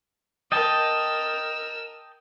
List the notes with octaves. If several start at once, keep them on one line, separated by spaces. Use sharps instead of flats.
A#4 D#5 G5 A5 E6